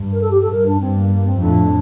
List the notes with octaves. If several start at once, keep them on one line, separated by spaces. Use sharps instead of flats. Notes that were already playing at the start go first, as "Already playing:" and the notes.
Already playing: G2
A#4
A4
G4
A4
G2 A#4
D4
G2 C4
A#3
A#3
C4
F2 A2 D4